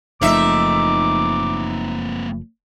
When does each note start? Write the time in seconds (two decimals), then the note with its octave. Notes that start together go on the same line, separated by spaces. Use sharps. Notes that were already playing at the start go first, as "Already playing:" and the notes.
0.22 F#1 F3 A3 A#3 C4 D#4 E5 D6